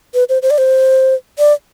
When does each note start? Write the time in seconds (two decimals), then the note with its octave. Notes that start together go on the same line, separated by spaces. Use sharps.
0.14 B4
0.29 C5
0.42 C5
0.50 D5
0.58 C5
1.39 D5